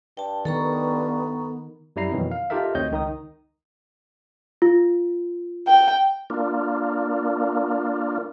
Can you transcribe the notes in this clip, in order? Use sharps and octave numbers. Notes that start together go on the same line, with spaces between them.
G2 G5 A5
D#3 B3 A4 A#5 C#6
F#2 G3 E4 A#5 C7
F2 B2 D#3 E3 F#3
F5
D#4 F4 G4 A4 A#4 E5
D2 C4 C#5 D#5 G6
C#2 D#3 D#4 D#6
F4
G5
A#3 D4 F4